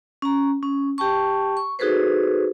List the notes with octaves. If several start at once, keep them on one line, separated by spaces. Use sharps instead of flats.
C#4 A#5
C#4
G4 G5 A5 C#6
C#6
D#4 F#4 G#4 A4 B4 C5